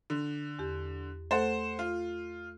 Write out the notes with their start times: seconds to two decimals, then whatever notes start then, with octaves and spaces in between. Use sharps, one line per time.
0.10 D3
0.59 E2 G4
1.31 A3 A4 C5 F#5
1.79 F4